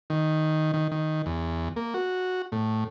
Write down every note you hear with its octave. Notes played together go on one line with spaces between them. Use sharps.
D#3
D#3
D#3
E2
A#3
F#4
A2